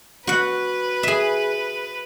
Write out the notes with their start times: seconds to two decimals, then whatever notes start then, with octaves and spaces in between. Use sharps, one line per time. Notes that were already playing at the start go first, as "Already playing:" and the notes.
0.27 F#4 B4 F#5
1.03 G#4 E5